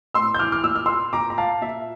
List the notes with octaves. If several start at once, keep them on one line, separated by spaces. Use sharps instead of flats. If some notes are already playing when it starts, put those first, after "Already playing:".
A2 C6 E6
G6
E3 D6 F6
D6 F6
A#2 E6
F6
C6 E6
A#2 A#5 D6
A#5
F5 A5
A#2 E5